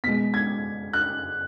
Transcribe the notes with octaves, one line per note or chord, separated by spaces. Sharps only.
B2 G#3 B6
G#6
F#6